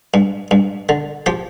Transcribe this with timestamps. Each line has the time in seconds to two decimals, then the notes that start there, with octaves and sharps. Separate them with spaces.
0.14 G2
0.51 G2
0.89 D3
1.26 F3 G4